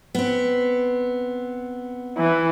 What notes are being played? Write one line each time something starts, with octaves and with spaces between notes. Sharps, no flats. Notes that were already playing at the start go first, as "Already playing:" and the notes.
B3 C4
E3